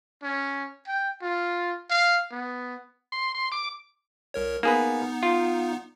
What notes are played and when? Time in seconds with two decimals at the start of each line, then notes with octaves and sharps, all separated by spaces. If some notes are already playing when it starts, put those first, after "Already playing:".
0.23 C#4
0.87 G5
1.22 F4
1.90 F5
2.31 B3
3.12 C6
3.35 C6
3.52 D6
4.34 C2 A#4 C#5
4.63 A#3 B3 D#4 G#4 B4
5.23 F4